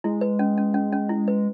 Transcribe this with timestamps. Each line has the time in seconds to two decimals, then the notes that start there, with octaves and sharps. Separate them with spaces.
0.04 G#3 E4
0.21 B4
0.39 C#4
0.58 C#4
0.74 C#4
0.93 C#4
1.09 E4
1.28 B4